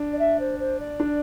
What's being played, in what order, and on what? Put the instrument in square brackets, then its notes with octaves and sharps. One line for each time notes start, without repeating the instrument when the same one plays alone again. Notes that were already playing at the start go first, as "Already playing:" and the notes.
Already playing: [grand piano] D4
[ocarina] D5
E5
C5
C5
D5
[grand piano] D4